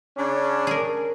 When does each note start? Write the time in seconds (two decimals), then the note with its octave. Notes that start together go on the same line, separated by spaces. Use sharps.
0.17 C#3 C#4 D4
0.67 G#4 A#4